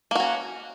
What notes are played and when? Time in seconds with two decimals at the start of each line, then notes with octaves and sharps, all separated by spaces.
0.11 A#3
0.15 F#4
0.20 C#4